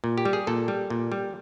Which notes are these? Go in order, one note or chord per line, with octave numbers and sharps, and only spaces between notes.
A#2
G4
G3
G#4
A#2 A4
G3
A#2
G3